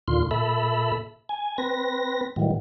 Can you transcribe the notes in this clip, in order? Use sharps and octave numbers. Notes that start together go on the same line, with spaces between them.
D#2 A#2 D3 F4 C6
A#2 A4 E5 B5
G#5
C4 B4 A#6
A2 D#3 E3 F#3 G3